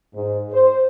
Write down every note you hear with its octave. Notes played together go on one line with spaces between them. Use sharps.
G#2
C5